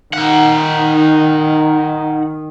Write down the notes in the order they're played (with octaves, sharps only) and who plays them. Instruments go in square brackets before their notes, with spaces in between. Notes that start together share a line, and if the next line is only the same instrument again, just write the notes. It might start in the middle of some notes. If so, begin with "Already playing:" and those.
[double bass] D#3 [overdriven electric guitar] D#4 F#5